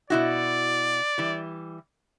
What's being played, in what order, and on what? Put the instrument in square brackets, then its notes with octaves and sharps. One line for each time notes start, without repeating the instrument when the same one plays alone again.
[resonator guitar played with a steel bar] B2 E4 F#4 [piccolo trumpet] D5
[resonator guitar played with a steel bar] E3 G3